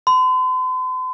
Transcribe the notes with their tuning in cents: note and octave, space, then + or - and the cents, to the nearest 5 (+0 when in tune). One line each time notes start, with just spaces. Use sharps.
C6 -45